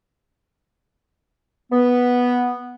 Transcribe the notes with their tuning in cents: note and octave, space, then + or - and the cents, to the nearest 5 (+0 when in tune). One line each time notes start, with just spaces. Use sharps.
B3 -5